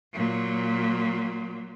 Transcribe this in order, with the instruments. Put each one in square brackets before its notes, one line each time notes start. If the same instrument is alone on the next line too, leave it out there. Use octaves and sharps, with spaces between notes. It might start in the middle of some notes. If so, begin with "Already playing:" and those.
[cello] A#2 F#3